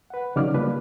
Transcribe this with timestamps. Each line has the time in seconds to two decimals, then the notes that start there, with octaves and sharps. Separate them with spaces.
0.10 B4 F#5
0.36 C#3 F#3 D#4 D5 D6 F6
0.54 G3 A#3 D4 F4 B4